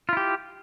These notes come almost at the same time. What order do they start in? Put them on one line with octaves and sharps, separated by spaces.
F4 E4 G4